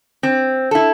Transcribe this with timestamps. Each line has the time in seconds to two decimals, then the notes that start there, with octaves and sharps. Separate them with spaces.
0.23 C4
0.71 E4 A4